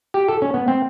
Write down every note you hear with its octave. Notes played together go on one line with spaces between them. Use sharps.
G4
A4
C#4
B3
C4